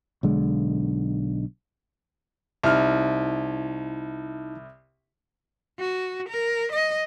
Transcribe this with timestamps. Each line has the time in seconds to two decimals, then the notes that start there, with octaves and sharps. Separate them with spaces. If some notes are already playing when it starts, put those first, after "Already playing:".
0.23 B1 D3 G#3
2.63 C2 D#4 E4 A5 F6
5.79 F#4
6.29 A#4
6.72 D#5